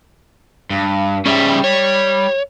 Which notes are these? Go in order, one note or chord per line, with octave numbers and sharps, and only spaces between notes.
G2
G3 C#4 G#4 E5
C#5